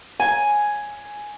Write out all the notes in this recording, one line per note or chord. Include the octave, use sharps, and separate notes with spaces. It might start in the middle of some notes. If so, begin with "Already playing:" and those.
G#5